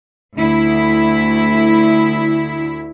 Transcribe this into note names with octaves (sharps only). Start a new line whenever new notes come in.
D2 E4